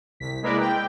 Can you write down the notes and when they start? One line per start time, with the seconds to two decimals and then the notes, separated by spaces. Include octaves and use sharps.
0.20 C2 B6
0.42 G#3 A#3 E4 A#4 B4 D5
0.60 G5